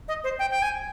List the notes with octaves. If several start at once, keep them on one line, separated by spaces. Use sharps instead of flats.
D#5
C5
G5
G5
G#5